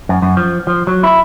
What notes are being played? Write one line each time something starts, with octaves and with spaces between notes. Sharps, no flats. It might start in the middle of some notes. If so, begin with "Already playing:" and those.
F#2
F#2
F3
F3
F#3
E4